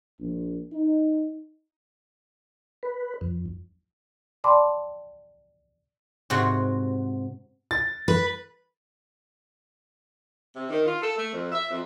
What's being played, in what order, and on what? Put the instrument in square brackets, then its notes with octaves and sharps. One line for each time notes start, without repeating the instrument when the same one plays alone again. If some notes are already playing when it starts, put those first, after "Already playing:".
[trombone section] A#1
D#4
[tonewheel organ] B4
F2
[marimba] D5 G5 A5 B5 C6 D6
[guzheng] G#2 C3 F#4
[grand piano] A6
[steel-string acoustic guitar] B4
[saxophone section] C3
D#3
F4
A4
A3
F2
E5
F2